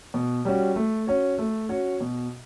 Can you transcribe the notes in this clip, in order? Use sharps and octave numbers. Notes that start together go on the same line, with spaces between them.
B2
G3 C#4 F#4
A3
C#4 F#4 C#5
A3
C#4 F#4 C#5
B2